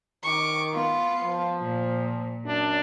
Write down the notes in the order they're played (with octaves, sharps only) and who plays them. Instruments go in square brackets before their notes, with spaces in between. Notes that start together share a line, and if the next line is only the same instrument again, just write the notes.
[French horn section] D#3 [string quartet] C#6 D6
[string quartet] B3 F4
[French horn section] F3
[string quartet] A#2
[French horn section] F#2 D4